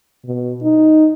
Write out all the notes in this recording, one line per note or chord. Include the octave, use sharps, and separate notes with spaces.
B2
D#4